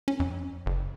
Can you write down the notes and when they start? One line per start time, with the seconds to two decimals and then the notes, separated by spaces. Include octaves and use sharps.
0.08 C#4
0.20 F2
0.66 F#1